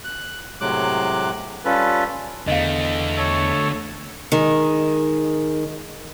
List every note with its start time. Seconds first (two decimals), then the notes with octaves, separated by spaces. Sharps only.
0.04 F#6
0.61 A2 C3 F#3 G#3 D6 F#6
1.65 G3 C#4 F4 A4 B4
2.47 E2 D3 A3 D#5 F5
3.17 A4 C#5
4.32 D#3 G#3